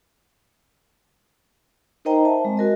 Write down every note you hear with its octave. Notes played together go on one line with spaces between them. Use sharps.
D#4 A#4 C5 D#5 G5 A#5
C5 E5 A5
G#3 C4
F#4 A#4 D#5